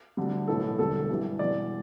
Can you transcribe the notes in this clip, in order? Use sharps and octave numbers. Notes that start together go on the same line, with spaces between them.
D2 D3 G3
B1 A2 E3 A4
E1 D2 D3 G3 A4
G1 G2 E3 G3
E1 E2 E3 G3 D5